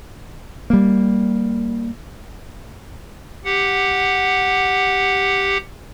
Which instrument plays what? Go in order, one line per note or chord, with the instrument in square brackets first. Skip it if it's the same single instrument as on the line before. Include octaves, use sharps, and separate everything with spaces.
[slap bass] G3 A#3
[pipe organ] G4 F#5